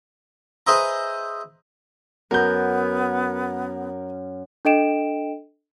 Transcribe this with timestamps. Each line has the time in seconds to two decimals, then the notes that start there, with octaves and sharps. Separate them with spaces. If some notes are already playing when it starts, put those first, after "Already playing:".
0.67 G#4 B4 C5 D#5 E5 A#5
2.31 F#2 B3 A#4 G6
4.65 D4 A4 D#5 G5 D7 E7